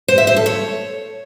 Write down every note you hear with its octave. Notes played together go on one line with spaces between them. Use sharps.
C5
E5
C5
A4
C#5